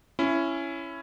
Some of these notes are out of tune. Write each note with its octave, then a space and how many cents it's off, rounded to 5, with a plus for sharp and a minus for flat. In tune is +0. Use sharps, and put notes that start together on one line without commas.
C#4 +0 E4 +15